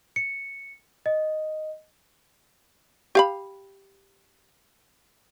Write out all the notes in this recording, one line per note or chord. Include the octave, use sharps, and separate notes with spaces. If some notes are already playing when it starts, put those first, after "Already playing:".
C#7
D#5
G4 F5 B5